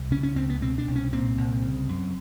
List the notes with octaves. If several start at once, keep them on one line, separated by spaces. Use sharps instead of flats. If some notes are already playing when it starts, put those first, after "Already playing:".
Already playing: C2
C#3 C#4
C#4
C#2 C4
B3
B2 C4
D4
C2
C#4
A#2 C4
C2
C#3
F#2